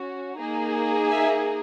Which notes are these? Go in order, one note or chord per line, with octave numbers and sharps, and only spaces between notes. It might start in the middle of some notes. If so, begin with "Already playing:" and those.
Already playing: C#4 F#4
A#3 D#4 G#4
E5 G#5